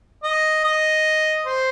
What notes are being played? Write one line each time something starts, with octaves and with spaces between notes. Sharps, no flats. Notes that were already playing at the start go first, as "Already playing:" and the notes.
D#5
D#5
C5